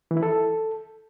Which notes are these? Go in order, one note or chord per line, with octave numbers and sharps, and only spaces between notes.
E3
E4
A4